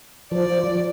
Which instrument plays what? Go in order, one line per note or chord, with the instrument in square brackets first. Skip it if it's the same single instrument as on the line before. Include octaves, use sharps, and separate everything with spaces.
[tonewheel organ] F3 [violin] D5